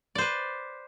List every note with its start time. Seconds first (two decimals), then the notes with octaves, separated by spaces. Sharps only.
0.15 D5
0.18 C5
0.21 B4